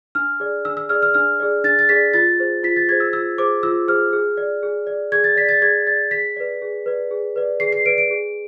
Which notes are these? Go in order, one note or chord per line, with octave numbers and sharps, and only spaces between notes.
D4 F6
G#4 D5
D4 E6
E6
G#4 D5 F6
F6
D4 F6
G#4 D5
D4 A6
A6
G#4 D5 B6
F4 A6
G#4 C5
F4 B6
A6
G#4 C5 G#6
E6
F4 E6
G#4 C5 D6
F4 E6
G#4 C5 F6
G#4
D5
G#4
D5
G#4 G#6
A6
D5 B6
A6
G#4 G#6
D5 A6
G#4 B6
B4 D5
G#4
B4 D5
G#4
B4 D5
G#4 C7
C7
B4 D5 D7
D7
G#4